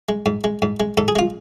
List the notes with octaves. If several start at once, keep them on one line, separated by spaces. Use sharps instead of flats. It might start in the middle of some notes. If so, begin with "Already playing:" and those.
G#3
G#2
G#3
G#2
G#3
G#2 A4
G#4
G#3 F4